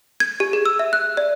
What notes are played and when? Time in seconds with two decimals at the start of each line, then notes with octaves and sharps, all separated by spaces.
0.20 G#6
0.40 G4
0.53 G#4
0.66 E6
0.79 E5
0.93 F#6
1.17 D5